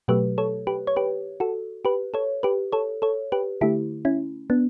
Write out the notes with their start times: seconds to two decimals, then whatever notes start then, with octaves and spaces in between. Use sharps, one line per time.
0.08 B2 F#3 A3 G4 B4
0.38 A4 C#5
0.67 G4 B4
0.87 C#5
0.96 G4 B4
1.40 F#4 A4
1.85 G4 B4
2.14 A4 C#5
2.43 G4 B4
2.72 A4 C#5
3.02 A4 C#5
3.32 G4 B4
3.61 D3 A3 E4 G4
4.05 C#4 E4
4.50 B3 D4